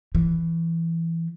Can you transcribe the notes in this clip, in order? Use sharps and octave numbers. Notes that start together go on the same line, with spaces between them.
E3